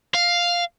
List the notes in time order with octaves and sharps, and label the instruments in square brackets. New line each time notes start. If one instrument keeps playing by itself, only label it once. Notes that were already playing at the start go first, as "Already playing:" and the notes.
[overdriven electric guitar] F5